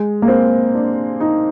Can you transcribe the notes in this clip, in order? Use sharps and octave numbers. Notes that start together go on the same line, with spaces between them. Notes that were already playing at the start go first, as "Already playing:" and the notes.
Already playing: G#3
A#3
C4
D4
D#4